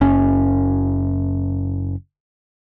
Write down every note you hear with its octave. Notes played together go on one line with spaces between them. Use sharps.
F#1 C#4